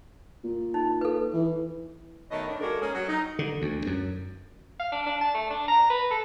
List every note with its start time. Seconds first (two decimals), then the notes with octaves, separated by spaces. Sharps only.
0.44 A#2
0.74 D#4
1.01 A4 B4
1.34 E3
2.31 B2 D#3 A3 C#5 D#5
2.48 D#3 D4
2.60 G#3 A#3 F#4 A4 A#4
2.81 A#3 C#4 G#4
2.94 F#3
3.08 D#4
3.39 D3
3.62 D2
3.87 F#2
4.79 F5
4.92 D4
5.07 D4
5.21 A5
5.34 A3
5.51 D4
5.68 A#5
5.90 B4
6.11 A4